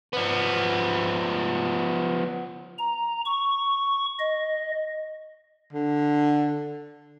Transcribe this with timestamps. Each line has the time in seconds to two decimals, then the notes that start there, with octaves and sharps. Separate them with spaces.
0.13 F3 B3
2.78 A#5
3.26 C#6
4.20 D#5
5.73 D3